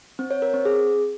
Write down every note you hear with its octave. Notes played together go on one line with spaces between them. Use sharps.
C4
C#5
A#4
C4
G#4